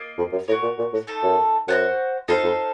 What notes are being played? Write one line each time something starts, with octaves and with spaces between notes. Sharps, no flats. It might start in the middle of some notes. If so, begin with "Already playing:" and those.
Already playing: A#3 F4 D#5
F2
F#2
A2 F#4 A#4 C#5
A#2
A#2
A2
A3 D#4 A4
F#2
F#2 F#4 A4 C5 F#5
F2 D#4 A4 C5 F5
F2